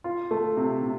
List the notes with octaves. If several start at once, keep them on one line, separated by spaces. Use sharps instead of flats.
F4
A3
C3
C3